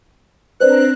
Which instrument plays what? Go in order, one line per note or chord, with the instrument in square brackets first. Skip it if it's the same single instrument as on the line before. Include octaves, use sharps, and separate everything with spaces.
[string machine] C4 D4 A#5 [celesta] B4 C5 D5 [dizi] F#6